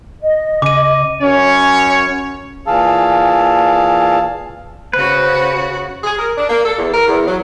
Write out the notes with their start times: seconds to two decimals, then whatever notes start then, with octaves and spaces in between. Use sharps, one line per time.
0.21 D#5
0.62 C#3 D6 D#7
1.21 F#2 C#4 C#5
2.67 A#2 E3 G#4 F5 A5 E6
4.93 C#3 F#4 B4 C5
6.04 G#4
6.18 A#4
6.38 D4
6.50 A#3
6.65 A4
6.78 E2
6.94 A#4
7.08 E2
7.27 F#3